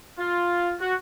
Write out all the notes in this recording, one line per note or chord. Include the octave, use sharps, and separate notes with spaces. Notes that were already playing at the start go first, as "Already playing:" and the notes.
F4
F#4